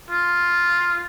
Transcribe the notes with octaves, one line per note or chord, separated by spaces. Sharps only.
F4